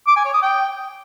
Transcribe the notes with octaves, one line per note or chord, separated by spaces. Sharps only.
D6
G#5
C#5
D#6
G5